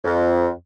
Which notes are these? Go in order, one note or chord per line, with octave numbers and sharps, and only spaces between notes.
F2